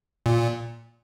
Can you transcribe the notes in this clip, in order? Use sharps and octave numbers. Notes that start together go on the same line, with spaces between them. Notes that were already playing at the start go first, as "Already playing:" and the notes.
A#2